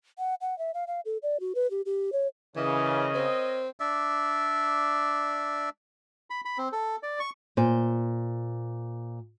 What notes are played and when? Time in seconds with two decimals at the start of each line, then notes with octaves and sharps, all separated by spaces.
0.18 F#5
0.41 F#5
0.59 E5
0.74 F5
0.87 F5
1.05 A4
1.23 D5
1.40 F#4
1.55 B4
1.71 G4
1.86 G4
2.13 C#5
2.56 C#3 E3 A#4 C#5 D#5
3.14 C4
3.80 D4 D5 E5
6.30 B5
6.45 B5
6.58 C4
6.72 A4
7.03 D5
7.20 C#6
7.57 A#2 C5